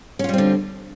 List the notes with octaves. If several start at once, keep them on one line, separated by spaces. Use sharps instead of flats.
D3 G3 C4 C#4 F4